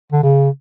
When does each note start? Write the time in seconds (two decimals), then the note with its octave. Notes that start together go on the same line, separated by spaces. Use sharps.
0.12 D3
0.23 C#3